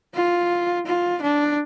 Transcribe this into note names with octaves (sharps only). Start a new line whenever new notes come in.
F4
F4
D4